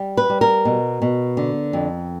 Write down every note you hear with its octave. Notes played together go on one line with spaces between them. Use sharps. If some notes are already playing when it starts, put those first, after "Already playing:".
Already playing: G3
B4
G3
A#4
B2
B2
D3
F2